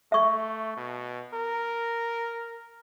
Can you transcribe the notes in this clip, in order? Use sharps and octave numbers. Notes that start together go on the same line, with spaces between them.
A3 E5 C#6
B2
A#4